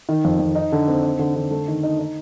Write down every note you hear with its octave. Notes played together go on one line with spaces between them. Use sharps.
D#3
F2
F2
D#4
D3
C4
D#4
D3
D3
A3
D#3
D#4
D#4